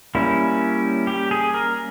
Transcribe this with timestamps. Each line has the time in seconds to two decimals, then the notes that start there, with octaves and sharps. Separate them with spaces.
0.15 G3 A#3 C#4 E4
1.07 G4
1.31 G#4
1.54 A#4